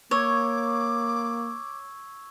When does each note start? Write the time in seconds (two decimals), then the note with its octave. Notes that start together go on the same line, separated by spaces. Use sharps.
0.11 A#3 C#5 C#6 D6 E6 G#6